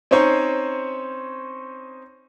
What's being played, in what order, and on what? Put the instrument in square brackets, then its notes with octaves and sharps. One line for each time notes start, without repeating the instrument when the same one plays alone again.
[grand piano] C4 C#4 D#4 C5 C#5